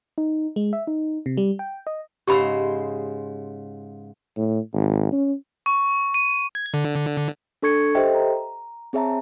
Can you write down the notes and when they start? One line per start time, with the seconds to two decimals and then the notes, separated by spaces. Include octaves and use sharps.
0.18 D#4
0.56 G#3
0.73 E5
0.87 D#4
1.26 C3
1.37 G3
1.59 G5
1.87 D#5
2.27 G#2 C#3 G4 C5 B5 E6
4.37 A2
4.74 G#1
5.12 C#4
5.66 C#6
6.14 D#7
6.55 G#6
6.74 D3
7.62 D4 A4 C#6 G#6 C#7
7.95 G4 A4 C5 D#5 E5 G5
8.15 A#5
8.93 C4 G#4 C#5 E5 A5 A#5